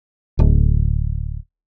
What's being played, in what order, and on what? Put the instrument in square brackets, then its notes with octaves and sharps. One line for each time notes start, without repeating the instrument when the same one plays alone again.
[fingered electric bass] D1